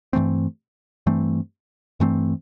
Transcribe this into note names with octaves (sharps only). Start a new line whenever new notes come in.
G2 E3 A3 C4
G2 E3 A3 C4
G2 E3 A3 C4